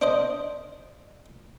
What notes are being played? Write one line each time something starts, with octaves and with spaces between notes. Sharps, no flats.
D4 C5 D#5